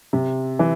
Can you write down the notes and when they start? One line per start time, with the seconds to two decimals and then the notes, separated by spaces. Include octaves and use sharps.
0.13 C3
0.59 E3